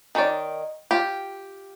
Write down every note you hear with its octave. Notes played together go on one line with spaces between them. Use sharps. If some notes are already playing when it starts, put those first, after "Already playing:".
D#3 D#4 C#5 D5
F4 G4